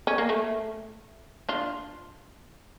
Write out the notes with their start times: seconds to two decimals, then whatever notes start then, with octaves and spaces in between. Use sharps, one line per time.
0.07 C#4
0.18 A#3
0.29 A3
1.49 D4 F4